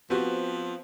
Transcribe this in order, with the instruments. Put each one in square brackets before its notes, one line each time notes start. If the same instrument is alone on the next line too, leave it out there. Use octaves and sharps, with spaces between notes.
[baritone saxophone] F3 [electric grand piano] B3 C4 B4 [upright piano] F#4 G4